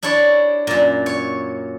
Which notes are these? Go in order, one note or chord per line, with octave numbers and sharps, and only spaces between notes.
D4 E4 G4 C#5 D5
F#2 A#2
C#5